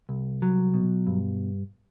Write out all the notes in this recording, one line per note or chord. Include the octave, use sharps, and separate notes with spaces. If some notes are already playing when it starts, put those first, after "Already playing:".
C2
F#3
B2
G2